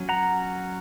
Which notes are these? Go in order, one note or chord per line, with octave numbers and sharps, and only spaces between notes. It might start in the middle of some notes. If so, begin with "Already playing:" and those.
Already playing: F#3 C#4
F#5 A#5